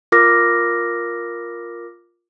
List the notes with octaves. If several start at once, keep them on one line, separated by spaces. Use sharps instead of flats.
F4 A#4 D6 F6 A#6